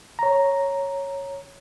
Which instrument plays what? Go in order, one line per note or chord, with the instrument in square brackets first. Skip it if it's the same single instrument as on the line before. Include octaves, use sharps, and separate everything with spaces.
[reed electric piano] C#5 A#5